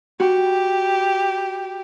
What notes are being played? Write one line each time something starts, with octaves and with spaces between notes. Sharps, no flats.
F#4 G4